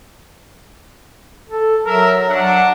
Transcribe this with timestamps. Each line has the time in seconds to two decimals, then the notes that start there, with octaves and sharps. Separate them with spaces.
1.49 A4
1.86 F#3 A#4 E5
2.30 D4 F#5